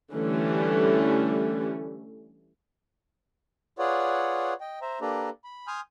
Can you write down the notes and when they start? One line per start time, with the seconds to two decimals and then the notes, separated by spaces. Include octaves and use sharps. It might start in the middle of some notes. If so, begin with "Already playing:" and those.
0.13 D3 E3 G3 A3 C#4
3.79 F4 G#4 B4 C#5 D5 F#5
4.61 D#5 G5
4.82 C5 E5 A#5
5.01 A#3 D4 G4 A4 B4 A#5
5.44 B5
5.67 G#5 C6 D#6 F6 G6